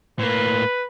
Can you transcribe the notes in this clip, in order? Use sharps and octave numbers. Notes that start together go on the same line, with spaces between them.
A2 A#3 B4